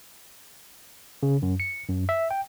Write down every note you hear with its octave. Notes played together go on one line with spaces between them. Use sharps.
C#3
F#2
C#7
F#2
E5
G5